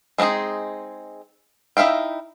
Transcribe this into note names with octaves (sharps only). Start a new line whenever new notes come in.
G#3 C4 D4 D#4 G#4
D#4 E4 E5 F5 G5